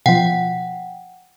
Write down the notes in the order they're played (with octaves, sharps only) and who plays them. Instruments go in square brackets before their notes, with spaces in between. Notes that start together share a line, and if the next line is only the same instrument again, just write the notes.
[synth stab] B2 F3 [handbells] F#5 G5